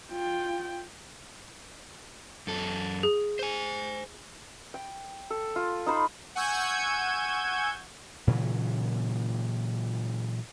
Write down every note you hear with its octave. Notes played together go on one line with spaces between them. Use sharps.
F4 G5
F#2 A4
G#4
C5 G#5
G5
A4
F4
D#4 C5 B5 C6
F#5 G#5 C#6 E6 G6 G#6
A#2 C#3 E3 F#3